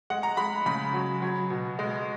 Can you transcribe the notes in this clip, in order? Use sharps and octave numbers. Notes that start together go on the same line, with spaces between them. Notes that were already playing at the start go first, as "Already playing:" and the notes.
G#3 F#5
A#5
G#3 B5
C#3 B5
F#3
F#3
B2
G#3